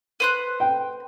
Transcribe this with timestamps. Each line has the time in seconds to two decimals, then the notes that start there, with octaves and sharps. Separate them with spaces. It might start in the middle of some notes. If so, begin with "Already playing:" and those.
0.20 B4 C5 F#6
0.60 G5